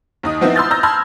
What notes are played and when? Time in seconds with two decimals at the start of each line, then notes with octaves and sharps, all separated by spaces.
0.23 D#2 D#4 D#6
0.41 F3 B3 C4 D#4 E4
0.56 B5 C6 E6 F6 G6 A6
0.71 A#5 E6 F6 G6 A#6
0.83 A5 B5 C6 E6 F6 G#6